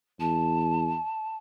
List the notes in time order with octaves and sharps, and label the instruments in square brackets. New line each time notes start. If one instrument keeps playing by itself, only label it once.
[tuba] E2 [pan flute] A5